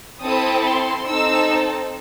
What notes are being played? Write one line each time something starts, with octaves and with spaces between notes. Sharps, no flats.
C4 E4 A4 D#6
C6
C4 D#4 A4 E6